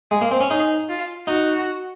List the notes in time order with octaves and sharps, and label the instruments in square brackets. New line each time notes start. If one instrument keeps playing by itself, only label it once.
[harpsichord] G#3 [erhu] G#4
[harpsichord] A#3
C4
C#4
[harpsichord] D#4 [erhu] G#4
[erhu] F4
[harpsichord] D#4 [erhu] F#4